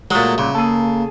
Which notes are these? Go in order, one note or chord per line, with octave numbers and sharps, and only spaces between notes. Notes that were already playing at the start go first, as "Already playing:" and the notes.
A#2 F#3 G#3 A3
C2 A#2 C#3
A#3 G#4 A4